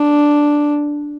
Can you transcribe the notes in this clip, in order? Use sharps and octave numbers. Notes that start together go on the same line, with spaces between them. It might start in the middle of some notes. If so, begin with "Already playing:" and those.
Already playing: D4